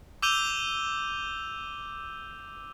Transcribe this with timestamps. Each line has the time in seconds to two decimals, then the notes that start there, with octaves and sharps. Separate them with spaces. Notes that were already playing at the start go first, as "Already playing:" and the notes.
0.22 D6 E6 G6 D#7 F7 G7